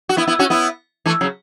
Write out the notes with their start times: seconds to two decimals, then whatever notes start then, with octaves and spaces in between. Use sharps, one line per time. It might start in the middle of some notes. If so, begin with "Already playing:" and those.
0.09 F#4
0.17 B3 E4
0.27 B3 E4
0.39 C#4 F#4
0.50 B3 E4
1.06 E3 A3
1.21 C#3 F#3